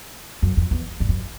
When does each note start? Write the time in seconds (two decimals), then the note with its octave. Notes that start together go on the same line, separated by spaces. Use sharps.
0.42 F#2
0.57 F2
0.71 E2
1.00 G2
1.09 F#2